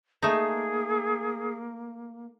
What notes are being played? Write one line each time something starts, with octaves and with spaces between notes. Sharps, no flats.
A3 A#3 D#4 G#4